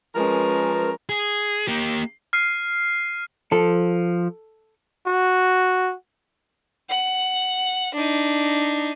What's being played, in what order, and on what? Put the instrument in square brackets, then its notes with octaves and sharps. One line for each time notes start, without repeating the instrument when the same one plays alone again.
[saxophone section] F3 A#4 [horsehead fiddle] G#3 C#4 [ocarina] B4
[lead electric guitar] G#4
A#3 G4
[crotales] F6 C7 D#7
[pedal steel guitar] F3 [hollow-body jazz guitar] A4
[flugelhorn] F#4
[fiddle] F#5
D4 D#4